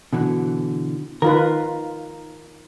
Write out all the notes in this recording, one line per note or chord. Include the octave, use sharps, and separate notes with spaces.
B2 D3 E3
D#3 F4 A#4 B4